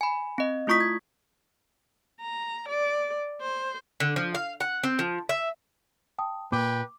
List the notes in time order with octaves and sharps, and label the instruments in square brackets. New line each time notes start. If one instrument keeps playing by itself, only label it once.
[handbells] G#5 B5
C4 D#5
A3 E4 F4 C#6 D#6 B6
G#6
[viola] A#5
D5
C5
[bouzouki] D3
F3
F5
F#5
C4
F3
E5
[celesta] G5 A5 D#6
[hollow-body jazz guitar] A#2 [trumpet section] B4 G5 [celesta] D6